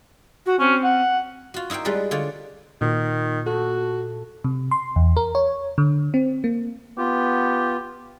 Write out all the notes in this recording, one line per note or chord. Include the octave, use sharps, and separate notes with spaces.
F#4
C4 C#4
F#5
F4 F#4
D#4 E4 A#4 C5 G5
G3 G#3 F4 B4 D#5
D3 F4 C#5 D5
A#2 D#3
F#4 A4
C3
C6
E2
A#4
C#5
D3
C4
A#3
B3 F4 G4